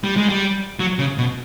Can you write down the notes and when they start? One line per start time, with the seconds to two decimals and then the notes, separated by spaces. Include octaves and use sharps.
0.04 G3
0.17 G#3
0.29 G3
0.79 F#3
0.99 C#3
1.18 B2